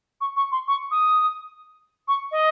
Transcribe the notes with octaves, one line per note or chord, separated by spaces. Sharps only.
C#6
C#6
C6
C#6
D#6
C#6
D#5